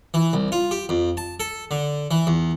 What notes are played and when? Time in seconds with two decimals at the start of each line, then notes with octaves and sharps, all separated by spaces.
0.14 E3
0.33 C2
0.52 F4
0.71 G4
0.89 F2
1.17 A5
1.40 A4
1.71 D3
2.11 E3
2.27 E2